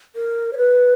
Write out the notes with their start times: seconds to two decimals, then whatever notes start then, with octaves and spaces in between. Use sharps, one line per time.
0.16 A#4
0.53 C#5
0.58 B4